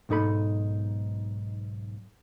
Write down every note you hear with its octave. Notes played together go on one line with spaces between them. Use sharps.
B1 G#2 D#4 A4 B5